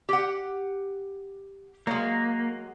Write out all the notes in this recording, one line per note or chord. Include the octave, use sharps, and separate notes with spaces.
G4 F#5
F#3 G#3 A#3